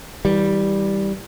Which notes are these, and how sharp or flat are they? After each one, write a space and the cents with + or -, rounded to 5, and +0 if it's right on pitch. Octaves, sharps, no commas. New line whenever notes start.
E3 -35 G3 +0